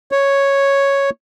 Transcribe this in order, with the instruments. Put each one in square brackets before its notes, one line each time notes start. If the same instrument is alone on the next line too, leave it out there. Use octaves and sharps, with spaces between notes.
[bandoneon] C#5